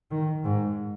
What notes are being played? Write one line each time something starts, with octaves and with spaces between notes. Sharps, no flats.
D#3
G#2